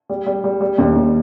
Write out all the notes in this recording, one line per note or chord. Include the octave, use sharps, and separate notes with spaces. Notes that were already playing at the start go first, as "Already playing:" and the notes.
G3
G3
G3
G3
D#2
D#2